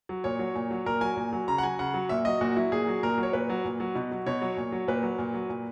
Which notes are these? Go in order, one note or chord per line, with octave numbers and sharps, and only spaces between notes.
F#3
A#2 C#5
F#3
A#2
F#3
A#2 A#4
F#3 G#5
A#2
F#3
C#3 A#5
F#5
F#3 G#5
C#3 F#5
F#3
A#2 E5
F#3 D#5
A#2 F#4
F#3 E4
A#2 G#4
F#3
A#2 A#4
F#3
C#5
A#2 B4
F#3
A#2
F#3
B2
F#3
B2 C#5
F#3
A#2
F#3
A#2 B4
F#3
A#2
F#3
A#2